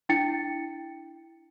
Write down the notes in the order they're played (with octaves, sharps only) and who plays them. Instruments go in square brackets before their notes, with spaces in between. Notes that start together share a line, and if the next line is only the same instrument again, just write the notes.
[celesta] D4 E4 G5 A6 C#7